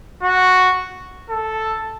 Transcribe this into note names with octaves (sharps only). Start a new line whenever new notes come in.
F#4
A4